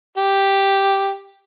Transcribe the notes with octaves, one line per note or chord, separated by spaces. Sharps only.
G4